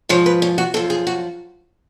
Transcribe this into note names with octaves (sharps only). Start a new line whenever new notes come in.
G#2 F3 C#5
B4
C#4
F#4
F#2 F3 A4
G#4
F#4